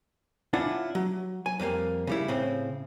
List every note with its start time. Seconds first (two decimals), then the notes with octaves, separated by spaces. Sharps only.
0.53 C#4 D4 E4 F4 F#5
0.95 F#3
1.46 G#5
1.60 F2 G3 A3 A#3
2.07 C#3 G3 E4
2.28 A2 C#3 C4